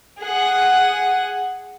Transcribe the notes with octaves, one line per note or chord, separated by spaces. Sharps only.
G#4 F#5